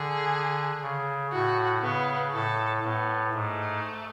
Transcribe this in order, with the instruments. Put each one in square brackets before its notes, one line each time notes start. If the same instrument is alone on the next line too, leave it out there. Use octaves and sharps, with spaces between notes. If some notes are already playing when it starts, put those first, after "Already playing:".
Already playing: [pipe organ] D3 [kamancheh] G#4
[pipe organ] C#3
[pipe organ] A2 [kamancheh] F#4
[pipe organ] C#3 [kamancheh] B3
[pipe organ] A2 [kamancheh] A4
[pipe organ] A2 [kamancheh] B3
[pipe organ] G#2 [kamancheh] A3